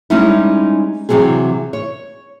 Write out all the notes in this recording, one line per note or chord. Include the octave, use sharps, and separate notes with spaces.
G3 G#3 C#4 D#4 E4
C3 E3 F#3 C4 G#4
C#5